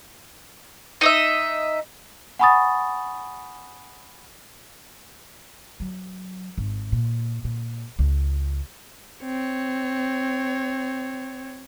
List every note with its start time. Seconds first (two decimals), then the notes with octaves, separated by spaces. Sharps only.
1.01 D#4 D#5 E5
2.39 F#5 G#5 B5 C#6 D#6 A6
5.80 F#3
6.58 G#1
6.92 A#2
7.44 A#2
7.99 C#2
9.23 C4 C#5